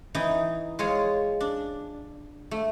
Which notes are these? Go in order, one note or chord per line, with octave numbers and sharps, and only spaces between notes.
E3 D#4
G#3 F4 C#5
D4
A3